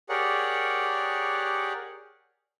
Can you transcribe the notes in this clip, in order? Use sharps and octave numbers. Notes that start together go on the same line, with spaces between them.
G4 G#4 A#4 C#5 D5 F#5